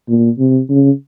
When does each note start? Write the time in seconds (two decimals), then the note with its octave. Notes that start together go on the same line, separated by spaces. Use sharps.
0.09 A#2
0.39 C3
0.69 C#3